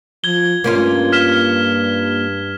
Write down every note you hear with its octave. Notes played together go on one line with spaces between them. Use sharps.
F3 G#6 G7
G2 A#3 C#4 F4
F6 B6 E7